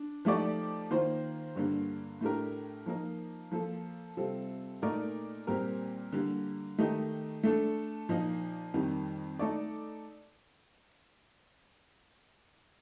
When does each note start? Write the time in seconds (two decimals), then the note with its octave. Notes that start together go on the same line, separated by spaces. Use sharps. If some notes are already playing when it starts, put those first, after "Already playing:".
Already playing: D4
0.25 F3 A3 D#4 G4 D5
0.91 D#3 A#3 F4 C5
1.56 G2 D3 G3 A#3
2.21 A2 A3 D4 G4 A#4
2.86 F3 A#3 D#4 A#4
3.52 F3 A#3 F4 A4
4.17 C3 G3 C4 F4 A4
4.82 A#2 A3 D#4 A#4 D5
5.47 A#2 G3 C4 G4 A#4
6.13 D3 G3 A#3
6.78 D#3 A3 D#4 G4
7.43 A3 D4 A4
8.09 A#2 F3 A#3 D#4
8.74 F2 D#3 G3
9.39 A3 D#4 A4 D5